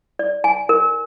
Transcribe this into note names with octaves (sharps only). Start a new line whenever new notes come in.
D5
G#5
A#4